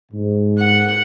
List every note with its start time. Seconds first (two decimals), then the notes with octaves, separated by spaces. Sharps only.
0.12 G#2
0.59 F#5